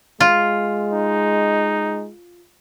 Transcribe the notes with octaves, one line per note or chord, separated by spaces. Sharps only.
G#3 F4
D#4